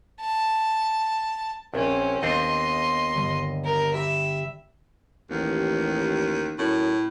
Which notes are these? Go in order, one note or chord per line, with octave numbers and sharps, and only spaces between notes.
A5
A#1 C4 C#4
D#2 B3 C4 D4 D#5 C6
G1 D3
A#4
G4 E5 B5
A1 D#2
F#2 A2